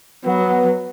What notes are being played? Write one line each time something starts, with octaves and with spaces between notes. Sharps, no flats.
F#3 B3